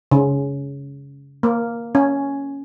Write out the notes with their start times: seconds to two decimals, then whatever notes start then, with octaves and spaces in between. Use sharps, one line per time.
0.11 C#3
1.43 A#3
1.95 C#4